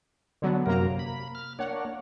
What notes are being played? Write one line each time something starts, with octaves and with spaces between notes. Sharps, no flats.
D3 F#3 B3
F#2 C3 F#3 A#3 A#4 A#5
B5
F6
A#3 D4 C#5 F#5